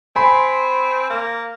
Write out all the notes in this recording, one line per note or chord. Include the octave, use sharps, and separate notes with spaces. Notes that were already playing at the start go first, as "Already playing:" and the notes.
C4 G#5 B5 C6
A#3